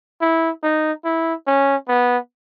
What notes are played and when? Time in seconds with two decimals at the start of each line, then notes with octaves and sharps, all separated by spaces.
0.21 E4
0.63 D#4
1.05 E4
1.47 C#4
1.88 B3